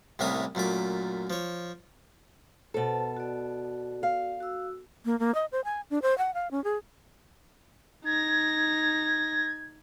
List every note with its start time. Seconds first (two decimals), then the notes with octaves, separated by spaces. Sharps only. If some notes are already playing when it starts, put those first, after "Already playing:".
0.19 C2 A2 A#3 C#4 E5 D#6
0.55 F#2 A#2 A3 D6
1.30 F3 C#5
2.74 B2 A4 C5 A5
3.17 F#4 D5
4.03 F5
4.40 F#4 E6
5.05 A#3
5.20 A#3
5.35 D#5
5.52 C5
5.64 G#5
5.90 D4
6.02 C5
6.18 F#5
6.34 F5
6.51 C#4
6.64 G#4
8.05 D#4 G#6 A#6